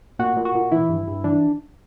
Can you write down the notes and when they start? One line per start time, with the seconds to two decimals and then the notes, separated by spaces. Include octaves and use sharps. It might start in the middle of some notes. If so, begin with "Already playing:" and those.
0.19 A#2 F#4
0.37 A#2
0.45 F#4
0.55 A#2
0.72 E3 E4
0.89 G2
1.07 G2
1.24 E3 D4